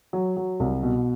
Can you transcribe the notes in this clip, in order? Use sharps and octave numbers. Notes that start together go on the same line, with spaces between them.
F#3
F#3
C2
B2